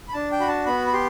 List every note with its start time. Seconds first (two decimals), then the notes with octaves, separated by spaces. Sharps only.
0.08 B5
0.13 D4 A5
0.32 G5
0.40 F#4 B5
0.48 A5
0.66 B3 B5
0.87 B5
0.93 G4 C6